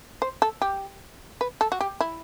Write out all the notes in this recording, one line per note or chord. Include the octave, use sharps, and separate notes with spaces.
C5
A4
G4
B4
A4
F#4
G4
E4